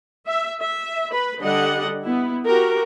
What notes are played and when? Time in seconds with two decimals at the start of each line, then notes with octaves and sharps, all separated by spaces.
0.27 E5
0.62 E5
1.11 B4 B5
1.40 D3 G3 D4 D#5 F#5
2.03 B3 E4
2.45 F#4 G4 A#4